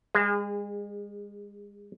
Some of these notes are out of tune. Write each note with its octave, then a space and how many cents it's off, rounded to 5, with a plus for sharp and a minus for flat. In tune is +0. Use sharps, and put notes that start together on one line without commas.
G#3 -35 G#4 -15